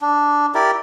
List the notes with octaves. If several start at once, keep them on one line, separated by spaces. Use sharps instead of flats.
D4
E4 G4 A#4 D5